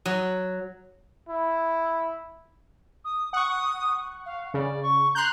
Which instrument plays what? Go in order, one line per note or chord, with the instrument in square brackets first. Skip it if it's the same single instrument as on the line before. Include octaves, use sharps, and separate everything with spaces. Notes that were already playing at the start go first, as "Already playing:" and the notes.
[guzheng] F#3
[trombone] E4
[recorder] D#6
[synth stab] F#5 C#6 [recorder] D#6
[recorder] F5
[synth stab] C#3 [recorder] D5
[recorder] C#6
[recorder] A#5 [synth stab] C6 F#6 G6